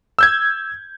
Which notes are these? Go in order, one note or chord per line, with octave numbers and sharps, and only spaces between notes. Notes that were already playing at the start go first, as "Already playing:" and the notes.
E6 G6 G#6